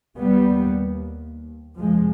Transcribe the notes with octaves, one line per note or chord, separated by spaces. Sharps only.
D#2 G3 B3
F2 C3 F3 G#3